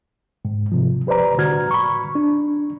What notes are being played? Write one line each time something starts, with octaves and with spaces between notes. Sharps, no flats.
G#2
C3 F3
G4 B4 C5 D5 A#5
A2 D3 F#4 A#5 F6 G#6
B5 C#6
D4